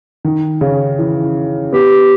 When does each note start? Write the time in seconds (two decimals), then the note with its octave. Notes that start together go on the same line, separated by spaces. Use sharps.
0.25 D#3
0.61 C#3
0.99 E3
1.73 B3 G4